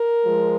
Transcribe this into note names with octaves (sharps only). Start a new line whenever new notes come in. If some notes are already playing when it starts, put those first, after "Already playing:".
Already playing: A#4
F3 G#3